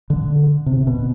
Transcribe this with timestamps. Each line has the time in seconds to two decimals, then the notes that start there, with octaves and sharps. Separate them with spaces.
0.10 D3
0.66 C3
0.87 B2